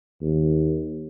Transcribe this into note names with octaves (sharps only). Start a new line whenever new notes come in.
D#2